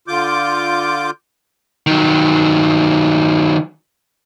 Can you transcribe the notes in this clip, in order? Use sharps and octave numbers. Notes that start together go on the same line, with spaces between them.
D3 F4 D6 G6
D#3 F#3